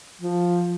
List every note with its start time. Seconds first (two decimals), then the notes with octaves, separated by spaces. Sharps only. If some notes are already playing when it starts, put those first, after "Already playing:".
0.22 F3